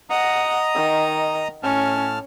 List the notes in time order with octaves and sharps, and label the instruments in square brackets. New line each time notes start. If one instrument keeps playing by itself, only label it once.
[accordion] D#5 A#5 D#6 [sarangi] F#5
[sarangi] D#3
[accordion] A2 A5 F6 [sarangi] C#4